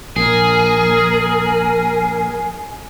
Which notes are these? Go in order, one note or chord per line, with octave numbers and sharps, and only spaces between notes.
A#1 G#4 A#4